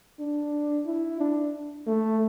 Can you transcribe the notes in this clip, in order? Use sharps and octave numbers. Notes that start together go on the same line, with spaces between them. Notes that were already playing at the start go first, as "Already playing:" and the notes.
D4
E4
D4
A3